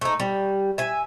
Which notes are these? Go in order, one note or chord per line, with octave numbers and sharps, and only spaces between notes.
A3 D#4
G3
E5 G#5